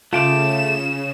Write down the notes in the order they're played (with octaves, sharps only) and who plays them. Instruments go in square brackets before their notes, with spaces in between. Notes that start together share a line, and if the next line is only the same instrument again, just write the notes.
[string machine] C#3 [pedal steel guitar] A3 G5 D6 [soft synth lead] F4 [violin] E7